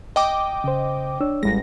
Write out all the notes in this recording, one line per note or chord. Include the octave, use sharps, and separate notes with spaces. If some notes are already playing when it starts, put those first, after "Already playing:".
D#5 G5 D6
C#3 C5
D4 C#5 E6
A1 G3 G#3 A#6